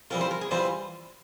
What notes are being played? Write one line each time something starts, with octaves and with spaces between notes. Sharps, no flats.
E3 G3 C4 F4 A#4
C5
A#4
G#4
E3 G3 C4 F4 C5